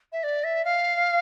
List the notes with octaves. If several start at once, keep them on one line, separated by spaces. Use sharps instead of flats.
E5
D5
E5
F5